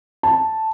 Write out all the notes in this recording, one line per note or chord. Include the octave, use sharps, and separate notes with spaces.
A5